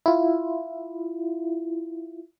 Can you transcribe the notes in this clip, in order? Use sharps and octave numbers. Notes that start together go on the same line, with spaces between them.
E4 F4